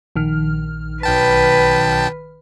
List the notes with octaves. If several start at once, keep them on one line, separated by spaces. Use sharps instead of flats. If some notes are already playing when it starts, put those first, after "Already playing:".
A#1 D#3 F6
B1 B4 G5 A5